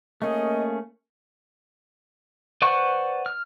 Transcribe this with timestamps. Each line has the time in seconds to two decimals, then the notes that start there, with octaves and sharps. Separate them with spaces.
0.22 A3 A#3 C#4 G#4 D#5
2.62 B4 C5 D5 F#5 C#6
3.26 F6